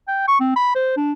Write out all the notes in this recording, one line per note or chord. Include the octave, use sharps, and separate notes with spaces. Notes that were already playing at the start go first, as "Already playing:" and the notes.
G5
C#6
C4
B5
C5
D4